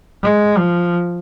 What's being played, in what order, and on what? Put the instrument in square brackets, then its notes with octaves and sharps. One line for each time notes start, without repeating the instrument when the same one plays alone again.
[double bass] G#3
F3